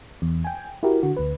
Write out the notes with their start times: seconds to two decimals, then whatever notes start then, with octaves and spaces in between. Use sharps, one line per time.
0.22 E2
0.44 G5 G#5
0.83 E4 F#4 G4 A#4
1.03 D3 F#4
1.17 D2 B4